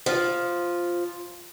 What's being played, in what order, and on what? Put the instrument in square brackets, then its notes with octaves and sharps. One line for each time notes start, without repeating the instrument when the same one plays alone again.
[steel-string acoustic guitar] F3